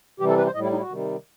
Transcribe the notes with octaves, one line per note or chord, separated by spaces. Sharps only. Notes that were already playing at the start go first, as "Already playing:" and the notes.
C3 E3 G3 G4
A4
B4
C5
A2 G3 E4 D#5
D#4
E4
F#4
C3 D#3 G3